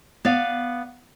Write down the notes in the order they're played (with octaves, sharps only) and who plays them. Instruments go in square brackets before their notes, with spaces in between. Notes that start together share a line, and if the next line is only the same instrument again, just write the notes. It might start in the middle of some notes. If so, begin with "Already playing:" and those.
[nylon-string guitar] B3 D5 F5